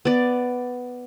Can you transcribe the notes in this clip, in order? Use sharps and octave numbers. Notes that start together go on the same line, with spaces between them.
B3 D5